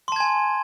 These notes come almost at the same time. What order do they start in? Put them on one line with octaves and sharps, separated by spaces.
C6 A5 G#6 G#5